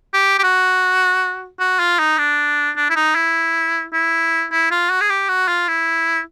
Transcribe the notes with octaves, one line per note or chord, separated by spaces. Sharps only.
G4
G4
F#4
F#4
F4
D#4
D4
D4
E4
D#4
E4
E4
E4
F4
F#4
G#4
G4
F#4
F4
E4